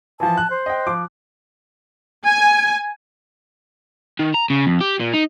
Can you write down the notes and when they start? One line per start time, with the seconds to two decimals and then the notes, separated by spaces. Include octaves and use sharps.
0.20 E3 F3 A5
0.37 F#6
0.50 C5
0.66 D#5 G5
0.86 F3 D6
2.26 G#5
4.19 D#3
4.34 A#5
4.50 C#3
4.66 F2
4.81 G4
5.00 A#2
5.13 D#4